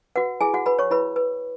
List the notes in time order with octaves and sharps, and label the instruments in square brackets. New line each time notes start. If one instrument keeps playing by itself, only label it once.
[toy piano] F#4 B4 F#5
E4 G#4 G#5
F#4 F#5
B4 B5
C#5 C#6
E4 B4 B5
B4